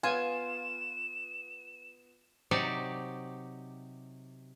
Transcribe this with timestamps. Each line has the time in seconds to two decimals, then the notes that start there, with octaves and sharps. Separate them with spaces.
0.03 B3 F4 B4 F#5 G#5 E7
2.51 C3 F#3 D#4 G4 D5